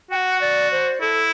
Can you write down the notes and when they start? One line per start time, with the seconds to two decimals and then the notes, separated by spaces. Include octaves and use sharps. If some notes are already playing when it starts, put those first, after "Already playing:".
0.11 F#4 G5
0.16 F#5
0.41 D5
0.72 C5
1.01 E4 A4